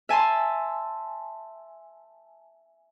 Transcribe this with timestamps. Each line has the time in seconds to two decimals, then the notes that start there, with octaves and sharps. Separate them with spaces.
0.09 E5 G#5 A5 C6